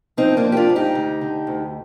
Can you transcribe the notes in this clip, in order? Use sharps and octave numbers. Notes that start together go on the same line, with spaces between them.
F3 C4 D#4
A#3 D4
F3
G4
D4 F4
G#2
D#4 G4
D2
D3
D2